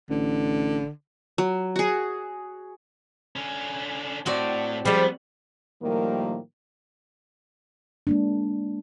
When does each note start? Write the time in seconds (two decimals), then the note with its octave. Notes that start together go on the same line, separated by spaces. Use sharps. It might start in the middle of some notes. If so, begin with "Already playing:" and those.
0.10 A1 D3
1.38 F#3
1.76 F#4 G#4
3.36 D3 C#4
4.26 A2 C4 F#4 D5
4.85 F3 G3 G#3 B3
5.82 A2 D#3 F3 G3 A#3
8.07 G#3 A#3 D4